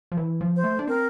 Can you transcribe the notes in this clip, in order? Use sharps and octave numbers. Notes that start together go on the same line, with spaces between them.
F3
E3
F3
C5
A3
D4
C4 A#4